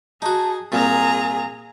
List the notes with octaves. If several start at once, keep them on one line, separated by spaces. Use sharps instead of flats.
D#4 F#4 G#4 A5
C2 A#2 G#4 G#5 A#5